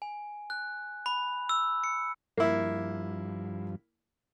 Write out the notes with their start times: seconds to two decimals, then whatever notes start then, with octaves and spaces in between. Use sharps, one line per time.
0.02 G#5
0.50 F#6
1.06 B5
1.49 E6
1.84 C#7
2.37 G2 F3 A#3 E4